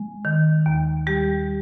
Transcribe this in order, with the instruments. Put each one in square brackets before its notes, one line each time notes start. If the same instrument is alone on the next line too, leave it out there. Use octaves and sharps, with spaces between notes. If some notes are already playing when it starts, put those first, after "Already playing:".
Already playing: [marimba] G#3
D#3
D#2
G3 G4